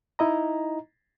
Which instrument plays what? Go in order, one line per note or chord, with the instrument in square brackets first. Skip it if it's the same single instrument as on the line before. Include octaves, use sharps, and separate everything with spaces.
[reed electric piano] D#4 E4 D#5 A#5